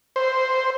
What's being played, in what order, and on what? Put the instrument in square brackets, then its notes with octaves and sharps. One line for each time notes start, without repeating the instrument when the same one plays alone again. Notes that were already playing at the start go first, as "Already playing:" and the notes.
[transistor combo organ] C5